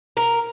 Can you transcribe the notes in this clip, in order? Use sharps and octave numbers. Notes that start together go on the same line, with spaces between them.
A#4